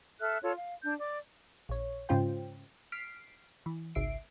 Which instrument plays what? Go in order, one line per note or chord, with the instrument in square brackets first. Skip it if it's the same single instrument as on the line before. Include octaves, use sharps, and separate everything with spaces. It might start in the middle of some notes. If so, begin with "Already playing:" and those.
[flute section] A4 E5 F6 F#6
F4 A4 C#5
F5
D4 G6
D5 D6
[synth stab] A#1 C#5
G#2 C#3 C#4 F4 C5 G5
F6 B6 C7 D7
E3
G#1 C#2 E5 C7 D7